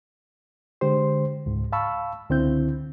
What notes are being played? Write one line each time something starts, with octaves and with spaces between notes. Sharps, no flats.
D3 G#3 G4 C5 C6
C#2 G#2
F5 A5 B5 C#6 E6
C#2 D3 C4 E4 G6